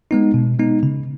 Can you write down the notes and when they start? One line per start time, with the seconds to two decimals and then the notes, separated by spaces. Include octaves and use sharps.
0.11 G#3 B3 D#4
0.34 B2
0.59 G#3 B3 D#4
0.83 C#3